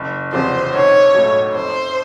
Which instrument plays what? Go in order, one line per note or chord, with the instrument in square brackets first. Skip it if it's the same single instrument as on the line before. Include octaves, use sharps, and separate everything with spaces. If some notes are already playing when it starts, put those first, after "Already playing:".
Already playing: [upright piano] F#1
[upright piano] E2 C3 F3 [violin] C5
[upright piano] B1 [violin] C#5
[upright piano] A2 F#3
[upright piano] F2 [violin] C5